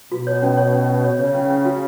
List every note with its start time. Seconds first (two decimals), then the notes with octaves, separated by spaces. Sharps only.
0.12 B2 F#4
0.27 C#5
0.42 C#4
0.57 C#5
0.73 C#4
0.89 C#4
1.04 C#3 C#5
1.19 C#5
1.35 C#4
1.50 C#4
1.65 F#4